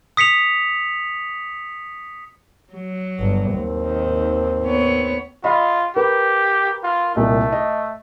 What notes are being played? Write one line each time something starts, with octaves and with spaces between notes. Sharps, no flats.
D#6 B6 C#7 F7
F#3
G1
D#2 C4
D#3
B3 C#5
F4 D#5 B5
G4 A#4 B4
F4
C2 A#2 A3 D#5
D#5